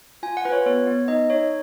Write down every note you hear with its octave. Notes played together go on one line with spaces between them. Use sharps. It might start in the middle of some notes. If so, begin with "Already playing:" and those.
F4 G#5
F#5
F4 B4
C#5
B3 C#5
B3
D#4 D#5
D#4 C#5